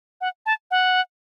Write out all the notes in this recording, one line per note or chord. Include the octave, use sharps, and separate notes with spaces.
F#5
A5
F#5